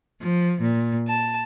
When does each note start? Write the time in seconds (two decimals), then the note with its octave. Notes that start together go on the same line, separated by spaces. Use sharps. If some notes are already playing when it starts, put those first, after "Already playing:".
0.20 F3
0.61 A#2
1.07 A5